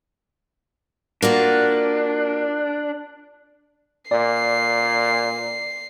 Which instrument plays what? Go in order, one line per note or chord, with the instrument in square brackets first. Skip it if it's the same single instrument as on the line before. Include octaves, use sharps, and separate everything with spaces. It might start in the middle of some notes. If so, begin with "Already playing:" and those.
[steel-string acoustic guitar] A#3 F4 F#4 [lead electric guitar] D4
[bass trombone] A#2 [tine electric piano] D5 [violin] C7